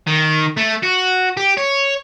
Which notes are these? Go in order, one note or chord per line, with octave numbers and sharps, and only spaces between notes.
D#3
A3
F#4
G4
C#5